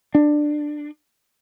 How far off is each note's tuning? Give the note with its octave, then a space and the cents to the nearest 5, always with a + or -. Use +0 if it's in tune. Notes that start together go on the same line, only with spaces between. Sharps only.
D4 +15